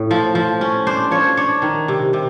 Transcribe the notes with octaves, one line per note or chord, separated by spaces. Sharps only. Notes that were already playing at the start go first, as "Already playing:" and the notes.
Already playing: A2
F3
F3
C#4
D4 C5
F3 C#5
D4 C#5
D#3
C3
C3